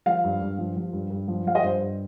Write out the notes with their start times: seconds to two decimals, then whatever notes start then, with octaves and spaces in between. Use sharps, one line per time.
0.06 F3 F5
0.24 G2
0.41 G2
0.58 F3
0.77 F3
0.93 G2
1.10 G2
1.28 F3
1.46 F3 F5
1.55 D#5
1.63 G2 C5
1.80 G2